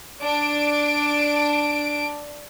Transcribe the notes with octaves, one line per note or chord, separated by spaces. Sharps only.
D4 D7